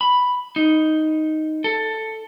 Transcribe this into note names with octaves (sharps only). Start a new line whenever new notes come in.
B5
D#4
A4